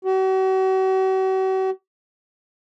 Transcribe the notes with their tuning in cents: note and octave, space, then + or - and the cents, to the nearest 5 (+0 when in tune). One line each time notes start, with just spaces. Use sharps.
F#4 +45